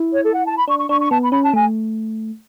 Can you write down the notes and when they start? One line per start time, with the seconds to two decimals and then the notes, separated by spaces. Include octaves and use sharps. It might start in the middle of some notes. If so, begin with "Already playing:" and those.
Already playing: E4
0.13 C#5
0.24 A4
0.35 F#5
0.46 A5
0.57 B5
0.68 D4 C#6
0.78 C#6
0.89 D4 C#6
1.00 C#6
1.10 B3 A5
1.22 B5
1.32 C#4 B5
1.43 A5
1.54 A3 G#5